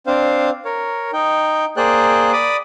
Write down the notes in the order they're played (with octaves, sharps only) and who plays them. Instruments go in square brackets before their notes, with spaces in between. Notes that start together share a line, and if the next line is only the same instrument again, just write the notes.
[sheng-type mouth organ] C4 D4 C5 F5
A#4 C#5
D#4 G5
A#3 G#4 C5 D5 G5 F#6
D5 B5 D6 D#6